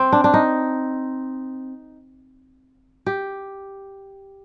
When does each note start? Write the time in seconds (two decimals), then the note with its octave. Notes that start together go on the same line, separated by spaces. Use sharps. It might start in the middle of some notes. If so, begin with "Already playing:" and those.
Already playing: C4
0.12 D4
0.24 D4
0.34 D#4
3.06 G4